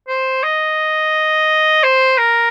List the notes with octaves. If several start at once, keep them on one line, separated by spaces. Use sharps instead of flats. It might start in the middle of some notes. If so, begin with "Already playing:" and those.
C5
D#5
C5
A#4